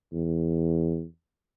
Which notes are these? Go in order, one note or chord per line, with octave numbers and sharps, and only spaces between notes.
E2